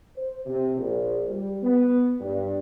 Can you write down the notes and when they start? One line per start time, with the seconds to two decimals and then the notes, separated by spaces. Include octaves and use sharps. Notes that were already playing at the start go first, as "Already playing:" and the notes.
0.16 C5
0.46 C3
0.77 A#1
1.29 G3
1.62 B3
2.20 G2